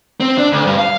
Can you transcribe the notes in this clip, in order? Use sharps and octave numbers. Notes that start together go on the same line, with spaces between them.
C4
D4
D2
G2
F5